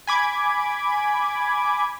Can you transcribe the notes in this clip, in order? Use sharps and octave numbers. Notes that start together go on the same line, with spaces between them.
G#5 B5 D6 G#6